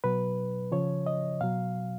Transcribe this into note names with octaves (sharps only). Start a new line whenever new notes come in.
B2 F#3 B4
C#3 F3 C#5
D#5
B2 F#3 F5